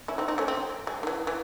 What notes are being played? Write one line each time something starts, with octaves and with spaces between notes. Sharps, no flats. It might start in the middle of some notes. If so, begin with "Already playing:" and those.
C#4 E4
C4 D#4
C4 D#4
A3 C#4
C4
G#3
D#3
E3
E3